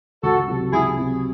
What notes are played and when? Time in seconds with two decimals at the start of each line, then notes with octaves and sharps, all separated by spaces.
0.23 C#2 F#4 A4
0.47 C3 F#3 C4 F#4
0.72 C#2 E4 G#4
0.97 C3 F#3 C4 F#4